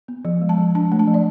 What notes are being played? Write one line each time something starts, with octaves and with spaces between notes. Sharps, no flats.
B3
F3
G#3
A5
F3
D4 A5
A3
A5
F3
D5